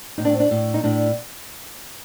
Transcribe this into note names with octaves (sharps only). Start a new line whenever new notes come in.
A2 D#4
D4
C4
D4
A2
D#4
A2 D4